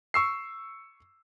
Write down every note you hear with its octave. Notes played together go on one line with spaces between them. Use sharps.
C#6 E6 C7